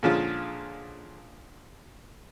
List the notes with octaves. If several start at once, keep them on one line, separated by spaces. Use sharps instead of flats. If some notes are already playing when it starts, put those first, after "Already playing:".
A#2 D3 F3 G#3 C#4 F4